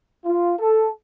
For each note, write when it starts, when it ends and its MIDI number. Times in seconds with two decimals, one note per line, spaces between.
0.25 0.54 65
0.59 0.89 69